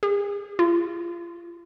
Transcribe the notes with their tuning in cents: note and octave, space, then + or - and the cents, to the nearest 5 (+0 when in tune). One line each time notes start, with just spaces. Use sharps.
G#4 -40
F4 -30